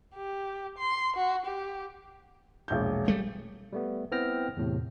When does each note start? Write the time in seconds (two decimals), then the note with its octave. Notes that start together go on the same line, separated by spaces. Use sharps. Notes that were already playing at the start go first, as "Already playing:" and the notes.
0.15 G4
0.78 C6
1.16 F#4
1.46 G4
2.68 E1 A#1 G6
3.08 G3 A3
3.73 G3 A3 B3
4.12 B3 C4 E4 G5 F6 A#6
4.57 E2 A2 C3